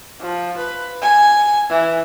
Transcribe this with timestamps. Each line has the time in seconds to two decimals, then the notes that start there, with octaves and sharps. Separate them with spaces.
0.20 F3
0.57 B4
1.02 G#5
1.70 E3